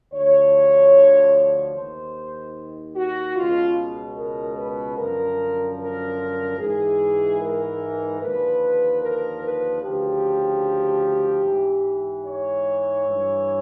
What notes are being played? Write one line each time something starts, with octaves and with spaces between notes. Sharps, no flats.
D2 D3 F3 C#5
D#2 D#3 C5
F#4
C#2 B2 F4
A#4
B4
F#2 D3 F3 A#4
A#4
G#2 E3 G#4
A#4
D#2 D3 F3 B4
A#4
B4
D2 C#3 F3 G4
G#2 E3
C#5
G2 E3